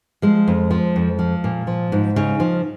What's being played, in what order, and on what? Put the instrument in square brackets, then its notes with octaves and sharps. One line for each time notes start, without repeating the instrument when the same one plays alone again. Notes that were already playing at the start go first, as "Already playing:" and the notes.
[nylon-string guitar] F3 G#3
F2
F3
F2
F3
A#2
F3
G#2
C#3 D#4
F3